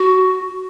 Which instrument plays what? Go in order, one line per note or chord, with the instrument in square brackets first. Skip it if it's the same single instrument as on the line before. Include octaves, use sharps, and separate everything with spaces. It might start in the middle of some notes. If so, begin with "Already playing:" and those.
Already playing: [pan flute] F#4